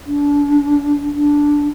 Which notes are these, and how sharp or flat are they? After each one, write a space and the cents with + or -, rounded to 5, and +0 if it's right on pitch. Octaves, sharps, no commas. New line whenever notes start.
D4 -30
D4 -5